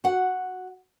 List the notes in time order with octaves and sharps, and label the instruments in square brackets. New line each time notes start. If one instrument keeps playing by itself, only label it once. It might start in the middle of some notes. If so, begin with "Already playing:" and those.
[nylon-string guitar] F#4 F#5